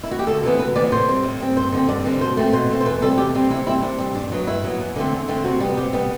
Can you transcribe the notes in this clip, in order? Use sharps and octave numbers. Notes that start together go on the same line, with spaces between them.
E4
F#4
G4
D2 A4
C3 E3 B3
D2 B4
C3 E3 B3 D5
A2 C5
G3 C4
A2
G3 C4
G2 C5
D3 G3 C4
G2 D5
D3 G3 C4
B2 C5
A3 C4
B2 C5
A3 C4
C5
E2 B4
C3 G3 C4 A4
E2 G4
C3 G3 C4
C3 E4
G3 C4 E4
C3 D4
G3 C4
G2 D4
F#3 B3
G2 E4
F#3 B3
E2
D3 A3 C4
E2
D3 A3 C4
C3 F#4
G3 B3
C3 G4
G3 B3